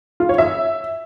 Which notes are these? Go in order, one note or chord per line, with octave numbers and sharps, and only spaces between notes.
F4
C#5
E5